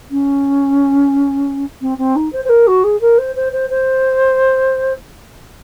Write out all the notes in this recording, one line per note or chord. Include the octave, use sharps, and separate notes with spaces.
C#4
C4
C4
D#4
C5
C5
A#4
F#4
G#4
A#4
C5
C5
C5
C5